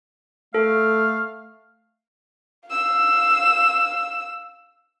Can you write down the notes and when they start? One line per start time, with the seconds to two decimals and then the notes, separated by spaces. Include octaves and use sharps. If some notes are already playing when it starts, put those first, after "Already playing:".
0.54 A3 A4 F5
2.68 F5 E6